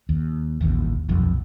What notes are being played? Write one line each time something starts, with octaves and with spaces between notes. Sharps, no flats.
D#2
D#1 A1 D#2
D#1 B1 F2